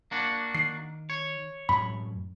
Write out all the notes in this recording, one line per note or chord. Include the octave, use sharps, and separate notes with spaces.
A#3 D4 F#4
D#3 C7
C#5
F#2 A2 B5